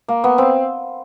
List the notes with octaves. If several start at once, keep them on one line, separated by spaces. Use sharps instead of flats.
A#3
B3
C4